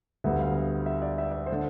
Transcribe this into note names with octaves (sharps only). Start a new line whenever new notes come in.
D2 D3 G3 B3 E5
F5
E5
D5
E5
D5
C5
D3